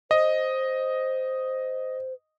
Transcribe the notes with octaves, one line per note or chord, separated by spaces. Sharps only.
C5 D#5